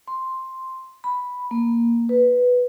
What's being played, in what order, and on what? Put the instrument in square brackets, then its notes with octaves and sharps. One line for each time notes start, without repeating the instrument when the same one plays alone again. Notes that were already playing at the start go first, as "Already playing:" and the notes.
[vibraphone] C6
B5
A#3
B4